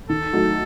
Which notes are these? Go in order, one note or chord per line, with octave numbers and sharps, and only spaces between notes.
D#3 A4
F#3 A3 D#4